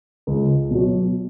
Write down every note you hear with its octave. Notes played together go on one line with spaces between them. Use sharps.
C#2
B2 F#3